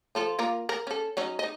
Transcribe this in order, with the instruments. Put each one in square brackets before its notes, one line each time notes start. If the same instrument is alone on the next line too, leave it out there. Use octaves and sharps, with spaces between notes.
[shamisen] F3 F4 A4
A#3 F4 A#4
A#4
C#4 A4
F#3 C#4 D#4
D#4 D#5